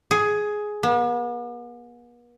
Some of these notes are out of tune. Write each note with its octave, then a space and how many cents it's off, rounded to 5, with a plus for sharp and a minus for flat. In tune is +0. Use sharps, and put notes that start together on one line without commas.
G#4 +10
B3 -45